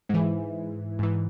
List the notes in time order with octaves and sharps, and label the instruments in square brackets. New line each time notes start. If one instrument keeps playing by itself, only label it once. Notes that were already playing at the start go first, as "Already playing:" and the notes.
[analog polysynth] G#2 E3
G#2 E3